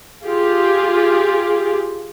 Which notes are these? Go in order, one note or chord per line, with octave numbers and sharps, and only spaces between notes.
F4 G4 G#4